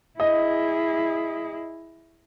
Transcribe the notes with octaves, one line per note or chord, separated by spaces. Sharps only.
E4 G#4 D#5